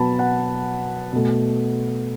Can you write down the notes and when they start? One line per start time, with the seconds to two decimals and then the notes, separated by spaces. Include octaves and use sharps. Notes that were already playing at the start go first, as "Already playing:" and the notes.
Already playing: B2 F#3 B3 A5 B5
0.19 F#5
1.13 B2 A3